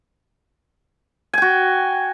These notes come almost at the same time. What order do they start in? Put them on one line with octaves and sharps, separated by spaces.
G#5 G5 F#4